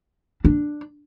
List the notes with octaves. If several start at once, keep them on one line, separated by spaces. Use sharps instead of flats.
D4